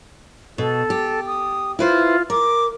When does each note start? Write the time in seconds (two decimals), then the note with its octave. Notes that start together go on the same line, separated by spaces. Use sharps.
0.58 B2 A4
0.90 G4
1.27 D#6
1.79 E4 F4 B4 C5
2.30 A#4 D6